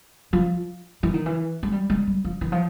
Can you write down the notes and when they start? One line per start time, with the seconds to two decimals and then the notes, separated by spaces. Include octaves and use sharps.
0.33 F3
1.03 E3
1.14 D#3
1.26 E3
1.63 G#3
1.72 G3
1.90 G#3
2.07 G3
2.24 F3
2.41 E3
2.52 F3